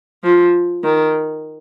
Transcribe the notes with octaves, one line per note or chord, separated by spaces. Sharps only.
F3
D#3